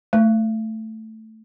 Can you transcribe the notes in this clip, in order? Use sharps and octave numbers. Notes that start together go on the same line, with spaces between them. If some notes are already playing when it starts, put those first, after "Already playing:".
A3